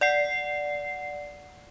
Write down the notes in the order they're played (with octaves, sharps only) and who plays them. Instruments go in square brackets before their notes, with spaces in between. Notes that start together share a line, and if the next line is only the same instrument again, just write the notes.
[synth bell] D5 F#5 C7